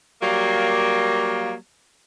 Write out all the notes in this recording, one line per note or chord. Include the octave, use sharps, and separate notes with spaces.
F#3 G3 A#3